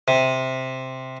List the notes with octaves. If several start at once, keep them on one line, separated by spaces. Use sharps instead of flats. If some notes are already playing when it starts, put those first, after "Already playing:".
C3